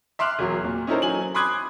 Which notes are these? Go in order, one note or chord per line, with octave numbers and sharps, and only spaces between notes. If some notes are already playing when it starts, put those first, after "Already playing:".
E5 C6 D6 F6 F#6
E1 F#3
A#2
C#4 D#4 E4 A4 A#4 C5
F#3 G#5 F#7
B5 C6 D6 D#6 F#6 G#6